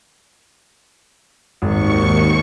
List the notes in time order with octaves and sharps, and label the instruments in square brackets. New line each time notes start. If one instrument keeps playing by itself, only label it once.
[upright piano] G#1 [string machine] D#2 C#6 C#7